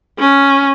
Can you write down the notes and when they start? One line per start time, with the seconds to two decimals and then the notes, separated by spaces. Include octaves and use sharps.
0.19 C#4